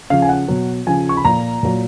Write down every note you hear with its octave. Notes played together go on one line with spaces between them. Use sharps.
C#3 F3 F5
G#5
F#5
B2 F#3
C#3 F3 G#5
C#6
B5
A#2 F3 A#5
A#2 F#3